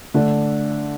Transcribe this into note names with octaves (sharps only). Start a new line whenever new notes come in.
D3 A3 D4